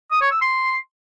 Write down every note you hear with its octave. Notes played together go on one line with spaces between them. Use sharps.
D#6
C#5
E6
C6